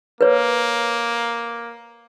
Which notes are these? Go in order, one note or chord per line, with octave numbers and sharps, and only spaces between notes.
A#3 B4 C#5